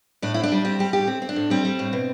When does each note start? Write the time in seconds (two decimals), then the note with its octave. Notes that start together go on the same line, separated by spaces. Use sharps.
0.22 A2 D4
0.34 C4 E4
0.43 D4
0.52 G3
0.65 C4 G4
0.79 G3 G4
0.93 A2 G4
1.07 C4
1.22 C4
1.29 D4
1.36 A2
1.50 G3 C4
1.65 G3
1.79 A2
1.93 B2